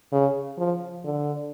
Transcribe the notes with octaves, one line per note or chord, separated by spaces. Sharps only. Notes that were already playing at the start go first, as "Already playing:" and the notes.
C#3
F3
D3